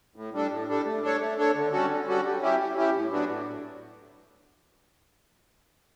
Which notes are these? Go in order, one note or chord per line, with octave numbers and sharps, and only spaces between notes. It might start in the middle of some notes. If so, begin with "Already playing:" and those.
A2
G3 D4 A4
A2
G3 D4 A4
A3
D4 A4 C#5
A3
D4 A4 C#5
D3
G3 C#4 F#4 A4
D3
G3 C#4 F#4 A4
G3
C#4 E4 G4
G3
C#4 E4 G4
A2
F#3 B3 D4 F#4
A2